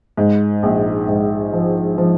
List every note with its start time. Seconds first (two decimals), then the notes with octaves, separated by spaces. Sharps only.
0.17 G#2
0.63 A#1
1.08 G#2
1.53 F3
1.98 F3